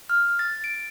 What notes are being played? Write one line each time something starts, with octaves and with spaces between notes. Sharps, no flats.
F6
A6
D7